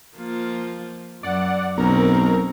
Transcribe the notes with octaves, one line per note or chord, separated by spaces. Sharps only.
F3 A#3 F4
F#2 D5 F#5
B1 B2 C4 C#4 A#4 A#5